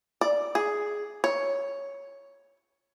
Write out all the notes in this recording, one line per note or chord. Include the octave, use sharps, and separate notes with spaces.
D5
G#4
C#5